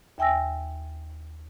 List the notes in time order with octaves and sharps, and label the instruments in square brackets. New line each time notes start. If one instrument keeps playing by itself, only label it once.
[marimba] D#2 E5 G5 G#5 E6 A#6